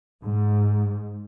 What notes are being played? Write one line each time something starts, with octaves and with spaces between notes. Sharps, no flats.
G#2